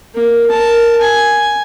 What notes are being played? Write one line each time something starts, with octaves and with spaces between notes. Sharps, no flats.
A#3
A#4 A5
G#5